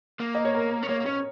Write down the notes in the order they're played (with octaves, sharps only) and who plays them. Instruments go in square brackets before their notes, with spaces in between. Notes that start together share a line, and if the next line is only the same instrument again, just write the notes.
[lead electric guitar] A#3
[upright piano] D#5
C#5
A#4
[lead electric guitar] C#4
[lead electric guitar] A#3 [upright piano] C#5
[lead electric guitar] A#3
[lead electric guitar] C#4 [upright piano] C#5